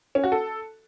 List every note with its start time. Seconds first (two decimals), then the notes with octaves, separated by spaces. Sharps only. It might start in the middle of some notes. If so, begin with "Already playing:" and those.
0.15 C#4
0.24 F#4
0.32 A4